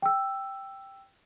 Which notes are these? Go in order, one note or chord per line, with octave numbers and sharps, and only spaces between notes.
G5 E6